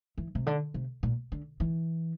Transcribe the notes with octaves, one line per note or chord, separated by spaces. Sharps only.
E3
C3
D3
C3
A#2
D3
E3